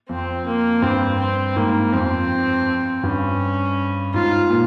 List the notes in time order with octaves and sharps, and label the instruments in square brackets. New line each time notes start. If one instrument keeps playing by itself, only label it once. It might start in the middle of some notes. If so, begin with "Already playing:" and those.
[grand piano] F2 [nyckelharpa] C4
[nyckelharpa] A#3
[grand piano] G2 [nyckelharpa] C4
[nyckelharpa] C4
[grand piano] G#2 [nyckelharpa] A#3
[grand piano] F2 [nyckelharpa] C4
[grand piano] G2 [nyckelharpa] C#4
[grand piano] G#2 [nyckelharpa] F4
[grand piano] A#2